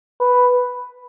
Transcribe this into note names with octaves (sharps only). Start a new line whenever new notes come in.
B4